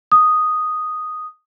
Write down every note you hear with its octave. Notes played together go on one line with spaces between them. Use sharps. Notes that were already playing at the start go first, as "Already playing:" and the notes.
D#6